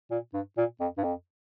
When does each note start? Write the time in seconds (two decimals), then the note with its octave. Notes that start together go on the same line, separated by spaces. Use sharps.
0.11 A#2
0.34 G2
0.57 A#2
0.80 F2
0.97 G2
1.03 F2